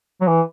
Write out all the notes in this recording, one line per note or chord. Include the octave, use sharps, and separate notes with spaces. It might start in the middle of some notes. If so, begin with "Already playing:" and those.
F#3
E3